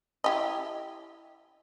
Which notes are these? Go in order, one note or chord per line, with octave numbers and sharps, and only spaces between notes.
E4 G4 D#5